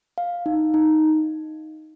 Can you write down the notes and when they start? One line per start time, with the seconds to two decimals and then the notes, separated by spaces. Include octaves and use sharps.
0.18 F5
0.46 D#4
0.74 D#4